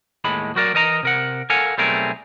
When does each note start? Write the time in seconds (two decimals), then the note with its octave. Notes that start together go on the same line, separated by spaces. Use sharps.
0.24 D#2 A2 G#3 B5
0.56 F#3 F#4 A#4 D5
0.74 E3 A#4 D#5 A#5
1.03 C3 A#4 F#5
1.50 A4 A#4 F5 F#5 G#5
1.78 B1 G3 A3 C4 G#4 A#4